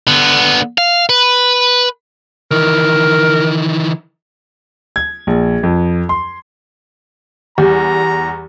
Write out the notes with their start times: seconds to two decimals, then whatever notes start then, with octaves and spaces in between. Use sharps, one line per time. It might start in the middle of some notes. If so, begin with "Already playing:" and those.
0.07 D3 B3
0.78 F5
1.09 B4
2.51 D#3 E3 A#4
4.96 G#6
5.27 A#1
5.63 F2
6.09 C6
7.58 E2 G3 G4 A#5